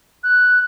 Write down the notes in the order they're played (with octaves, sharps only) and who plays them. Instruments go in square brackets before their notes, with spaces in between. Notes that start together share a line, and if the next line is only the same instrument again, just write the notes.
[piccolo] F#6